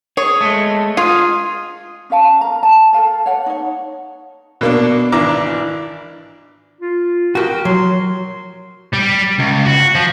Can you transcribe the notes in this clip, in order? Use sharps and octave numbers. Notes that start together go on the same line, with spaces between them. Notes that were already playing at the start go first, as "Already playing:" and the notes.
G#4 C#5
G#3 A3
F4 G#4
C#4 A#4 F5 A5
A#4 A#5
A5
A4 A#4 F5 A5
C#5 F#5
D#4 C#5
B2 A#3 D4
G#1 E3 D4 A#5 D6
F4
F#4 G4 A#4
F#3 C6
G3
C#2
F#4
F3